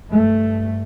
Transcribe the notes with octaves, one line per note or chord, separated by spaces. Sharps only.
G2 A3